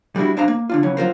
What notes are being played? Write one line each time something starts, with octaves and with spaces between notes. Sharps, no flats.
G3 G#3 D4 E4 F#4
G2 D4 C5 F5 A#5
A#3
D3 D4 F4
C#3 E3 F#3 C#4
F#3 F4 A#4 C5